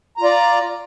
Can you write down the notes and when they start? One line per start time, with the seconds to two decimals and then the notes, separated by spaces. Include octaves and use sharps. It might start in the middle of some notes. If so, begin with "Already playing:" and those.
0.17 A#5
0.20 F4
0.24 D5